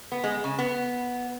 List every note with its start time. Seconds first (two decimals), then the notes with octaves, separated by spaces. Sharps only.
0.12 B3
0.24 G#3
0.44 C#3
0.59 B3